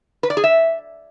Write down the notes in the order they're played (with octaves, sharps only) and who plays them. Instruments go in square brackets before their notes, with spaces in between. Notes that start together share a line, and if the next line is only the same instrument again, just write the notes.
[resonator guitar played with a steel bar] B4
D5
G#4
E5